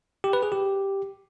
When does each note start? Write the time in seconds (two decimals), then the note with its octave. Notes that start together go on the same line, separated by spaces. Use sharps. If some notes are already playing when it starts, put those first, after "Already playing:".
0.24 G4
0.33 B4
0.43 G#4
0.52 G4